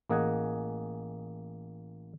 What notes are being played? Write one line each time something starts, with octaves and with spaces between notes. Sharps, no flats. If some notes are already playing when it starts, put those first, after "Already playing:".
A1 A#3 G#4 D#5 F#5 G#5